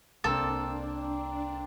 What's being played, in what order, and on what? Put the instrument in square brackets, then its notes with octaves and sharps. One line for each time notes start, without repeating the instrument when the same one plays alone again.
[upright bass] C2 [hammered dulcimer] A#3 C4 [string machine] D4 [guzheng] A4